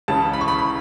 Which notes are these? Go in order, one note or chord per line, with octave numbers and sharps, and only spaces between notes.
C#2 C#3 E3 A5
B5
C#6
B5
B5